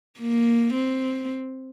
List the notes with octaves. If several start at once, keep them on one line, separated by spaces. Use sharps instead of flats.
A#3
C4